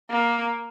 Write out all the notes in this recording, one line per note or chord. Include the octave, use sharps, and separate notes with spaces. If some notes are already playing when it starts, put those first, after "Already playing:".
A#3